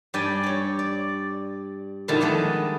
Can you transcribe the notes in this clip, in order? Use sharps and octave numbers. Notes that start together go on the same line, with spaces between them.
G2 G4 D5 G5 G#5
G4 C#5
D5
F2 A#2 D3 D#3 E4 A5
G3 G#3 B3 A4